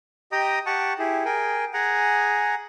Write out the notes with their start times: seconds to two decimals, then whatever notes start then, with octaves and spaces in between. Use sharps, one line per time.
0.32 G4 D#5 G5 A#5 D#6
0.66 G4 F#5 A5 C#6
0.99 E4 G4 G#4
1.25 G#4 A#4 G5 G#5
1.74 G#4 F#5 G#5 A#5